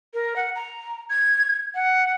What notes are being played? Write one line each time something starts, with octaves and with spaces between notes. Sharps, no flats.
A#4
F#5
A#5
G#6
F#5